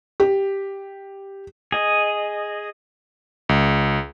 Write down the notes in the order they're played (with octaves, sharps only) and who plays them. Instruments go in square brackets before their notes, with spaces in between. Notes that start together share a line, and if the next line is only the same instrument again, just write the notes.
[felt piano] G4
[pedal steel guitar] G#4 D#5
[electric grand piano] C#2